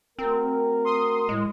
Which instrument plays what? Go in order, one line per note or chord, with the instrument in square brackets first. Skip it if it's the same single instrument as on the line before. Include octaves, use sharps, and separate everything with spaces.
[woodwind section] A3 F#4 A#4 [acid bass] C4
[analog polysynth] C6 D#6
[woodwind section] A2 [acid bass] G#3